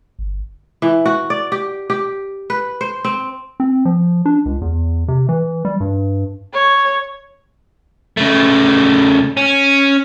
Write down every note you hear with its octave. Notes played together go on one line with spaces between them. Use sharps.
G1
E3
F#4
D5
G4
G4
B4
C5
C4
C4
F3
D4
C#2
E2
C3
E3
G3
G2
C#5
C#3 A3
C#4